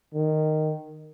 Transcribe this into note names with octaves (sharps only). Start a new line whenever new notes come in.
D#3